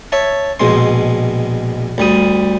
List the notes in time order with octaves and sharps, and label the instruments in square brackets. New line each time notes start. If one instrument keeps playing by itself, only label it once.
[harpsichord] C#5 E5 A5
A#1 B2 G#3 C6
D2 G3 D#6